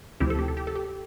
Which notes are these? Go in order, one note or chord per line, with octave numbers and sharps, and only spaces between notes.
D2 C3 F3 C4 E4 G4
A4
G4
A4
G4
A4
G4